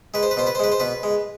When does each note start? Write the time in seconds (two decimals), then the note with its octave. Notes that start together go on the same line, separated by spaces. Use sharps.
0.14 G#3 B4
0.23 C5
0.31 B4
0.37 B2 C5
0.47 B4
0.55 C5
0.59 G#3 B4
0.72 C5
0.80 B2 B4
1.03 G#3